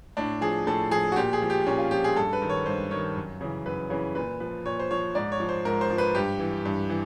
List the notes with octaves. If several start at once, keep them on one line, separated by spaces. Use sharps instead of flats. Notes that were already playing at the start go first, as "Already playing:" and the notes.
A2 D4
F3 G#4
A2 A4
F3 G#4
F#4
A#2 G4
G#4
F3
G4
A#2 C#4
F4
F3 G4
G#4
G2 A4
B4
D#3
C#5
G2 C5
D#3 C#5
F#2
C#3 E3
F#2 B4
C#3 E3
A#2 B4
F3 B4
A#2 C#5
C5
F3 C#5
G#2 D5
C#5
F3
C5
G#2 A#4
C5
F3
B4
G2 G4
E3
G2
E3